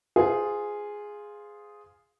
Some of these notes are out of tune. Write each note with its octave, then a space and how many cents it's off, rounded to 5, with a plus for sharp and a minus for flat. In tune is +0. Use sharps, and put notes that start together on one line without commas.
F4 +0 G#4 +0 C5 -30